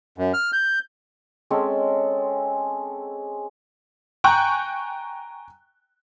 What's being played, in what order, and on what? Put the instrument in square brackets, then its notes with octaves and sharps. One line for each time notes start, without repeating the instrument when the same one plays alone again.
[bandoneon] F#2
F6
G6
[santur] G#3 C4 C#4 A4
[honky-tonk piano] G5 G#5 A#5 C#6 F#6